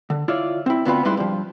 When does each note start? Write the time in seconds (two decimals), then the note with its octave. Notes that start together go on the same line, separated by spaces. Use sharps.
0.10 D3
0.28 E4 F4 C#5 D5
0.66 C4 E4
0.85 D2 B3 C4 F4 B4
1.05 G#2 G3 E4 B4 C6
1.17 G2 F3